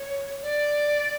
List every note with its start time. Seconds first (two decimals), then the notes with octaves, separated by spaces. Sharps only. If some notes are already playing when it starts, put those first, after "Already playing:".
Already playing: C#5
0.42 D5